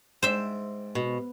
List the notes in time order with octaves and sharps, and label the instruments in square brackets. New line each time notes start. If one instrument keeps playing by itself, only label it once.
[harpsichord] G#2 C4 [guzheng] C5 E5
[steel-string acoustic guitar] B2